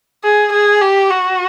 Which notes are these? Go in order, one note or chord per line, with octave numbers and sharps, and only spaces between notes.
G#4
G#4
G4
F#4